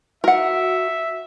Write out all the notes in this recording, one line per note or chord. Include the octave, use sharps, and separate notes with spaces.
F#4 A#4 E5 F#5